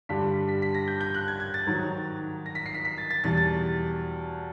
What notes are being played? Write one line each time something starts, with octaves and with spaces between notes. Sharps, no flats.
G2 D3 G3 B6
B6
B6
A#6
G6
G6
F#6
G#6
G#6
A6
G#2 D#3 F#3
A#6
B6
C7
B6
B6
A6
A6
E2 B2 G3 A6
A6